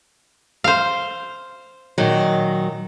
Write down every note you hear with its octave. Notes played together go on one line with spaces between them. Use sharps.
C5 F5
A#2 D#3 F#3